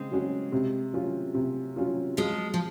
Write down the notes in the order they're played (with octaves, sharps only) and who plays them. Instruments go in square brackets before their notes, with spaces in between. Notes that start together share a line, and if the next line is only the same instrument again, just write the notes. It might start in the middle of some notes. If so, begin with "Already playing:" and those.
Already playing: [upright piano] C#3 [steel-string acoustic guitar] G#3 C4
[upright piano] F#3 C#4 F#4
C3
F#3 C#4 F4
C3
F#3 C#4 F4
[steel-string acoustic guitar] F3 G#3 [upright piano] F#3
[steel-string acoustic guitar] F3